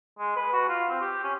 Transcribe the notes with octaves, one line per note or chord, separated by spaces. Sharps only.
G#3
B4
F#4
F4
C4
G4
C#4